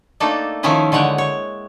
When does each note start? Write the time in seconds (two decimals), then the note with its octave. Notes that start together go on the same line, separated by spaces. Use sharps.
0.20 A3 A#3 D4 D#4 A4
0.63 D#3 F3 C#4 D#4 E4 D#5
0.92 D3 G#3 C#5 F#5 G5
1.18 C#5